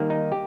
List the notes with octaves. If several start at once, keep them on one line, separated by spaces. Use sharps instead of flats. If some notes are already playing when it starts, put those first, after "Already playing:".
Already playing: D#3 G3 A#3
D#4
G4